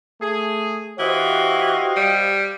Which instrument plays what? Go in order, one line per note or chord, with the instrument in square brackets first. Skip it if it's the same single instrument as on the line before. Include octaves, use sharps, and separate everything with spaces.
[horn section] A3 G#4
[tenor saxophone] E3 [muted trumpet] F#4 [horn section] G4 D#5 F5 [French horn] C5
[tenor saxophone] G3